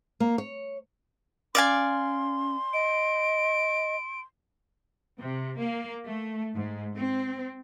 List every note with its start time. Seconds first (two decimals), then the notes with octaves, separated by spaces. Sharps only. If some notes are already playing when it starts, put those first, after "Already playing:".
0.20 A#3
0.38 C#5
1.55 C#4 D5 F5 G#5 C6
2.73 D#5 D7
5.18 C3
5.59 A#3
6.05 A3
6.54 G#2
6.95 C4